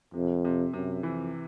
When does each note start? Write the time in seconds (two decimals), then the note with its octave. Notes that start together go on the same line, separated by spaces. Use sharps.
0.14 F2 C3
0.45 C3
0.73 F#2 C3
1.03 F2 E3